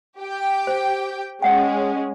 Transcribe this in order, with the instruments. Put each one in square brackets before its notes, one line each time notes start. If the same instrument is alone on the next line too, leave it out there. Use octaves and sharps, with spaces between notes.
[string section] G4 G5
[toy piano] C5
[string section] G#3 C#4 [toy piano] C#5 F#5 G5